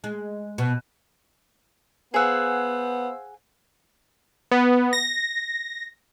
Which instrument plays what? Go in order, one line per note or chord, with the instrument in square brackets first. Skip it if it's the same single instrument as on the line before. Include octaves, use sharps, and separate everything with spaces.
[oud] G#3
B2
[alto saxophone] B3 [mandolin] G#4 F#5 [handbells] C5 F5 E6
[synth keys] B3
A#6